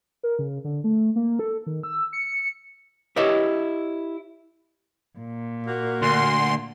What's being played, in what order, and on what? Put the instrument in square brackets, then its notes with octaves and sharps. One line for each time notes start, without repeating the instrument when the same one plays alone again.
[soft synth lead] A#4
C#3
D3
A3
A#3
A4
D#3
E6
C#7
[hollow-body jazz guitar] E4 G4 B4 C#5 D#5 E5
[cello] A#2
[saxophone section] A#3 F#4 A#4
[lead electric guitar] D2 [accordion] C6